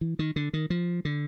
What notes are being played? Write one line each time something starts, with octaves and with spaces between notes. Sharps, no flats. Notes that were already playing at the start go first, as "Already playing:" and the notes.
E3
D#3
D3
D#3
F3
D3